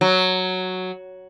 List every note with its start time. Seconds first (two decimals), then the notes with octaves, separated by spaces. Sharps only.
0.01 F#3